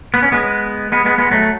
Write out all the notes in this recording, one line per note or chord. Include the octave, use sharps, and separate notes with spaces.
B3
C#4
G#3 B3
G#3 B3
G#3 B3
G#3 B3
F#3 A3